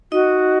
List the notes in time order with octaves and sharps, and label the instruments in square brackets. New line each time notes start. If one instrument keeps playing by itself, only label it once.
[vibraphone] D#4 D#5 [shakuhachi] F#4